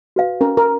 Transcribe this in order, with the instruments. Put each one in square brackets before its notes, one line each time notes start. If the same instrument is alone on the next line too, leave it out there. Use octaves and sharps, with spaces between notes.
[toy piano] F#4 B4 F5
[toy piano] C#4 [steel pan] A#4
[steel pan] A#4